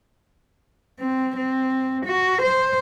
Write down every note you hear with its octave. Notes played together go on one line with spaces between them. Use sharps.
C4
C4
F#4
C5